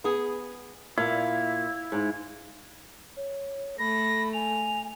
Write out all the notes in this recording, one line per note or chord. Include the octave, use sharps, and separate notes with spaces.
B3 G#4
A#2 A#3 E4 F5
G#2
C#5
A3 B5 A#6
G#5 F7